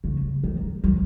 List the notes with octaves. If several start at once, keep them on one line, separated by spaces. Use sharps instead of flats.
C#3
D#3
F#3